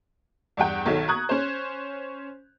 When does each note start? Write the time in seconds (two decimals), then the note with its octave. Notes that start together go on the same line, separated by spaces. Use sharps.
0.57 E2 G2 F#5 G5
0.86 B1 D#3 A4 C#5
1.08 A#5 C#6 D#6 F#6 G#6
1.29 C#4 C5